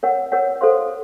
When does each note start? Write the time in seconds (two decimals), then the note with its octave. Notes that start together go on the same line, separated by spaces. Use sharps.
0.03 A#4 C#5 F#5
0.32 A#4 C#5 F#5
0.61 A4 C5 F5 C6